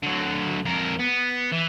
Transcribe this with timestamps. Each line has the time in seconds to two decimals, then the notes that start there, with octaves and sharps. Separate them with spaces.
0.03 D3 F#3
0.65 F2 A#4
0.99 B3
1.52 E3